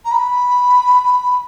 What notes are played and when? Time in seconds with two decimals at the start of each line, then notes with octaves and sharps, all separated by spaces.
0.04 A#5
0.11 B5